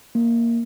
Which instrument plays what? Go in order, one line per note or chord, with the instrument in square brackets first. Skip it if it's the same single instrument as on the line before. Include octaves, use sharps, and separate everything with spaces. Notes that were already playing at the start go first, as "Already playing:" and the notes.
[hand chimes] A#3